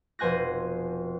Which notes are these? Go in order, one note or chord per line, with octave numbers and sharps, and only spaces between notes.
F1 B2 C5 G#5 F#6 A#6